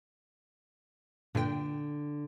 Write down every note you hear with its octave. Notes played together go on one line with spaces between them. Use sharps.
G2 A#2 D3 G5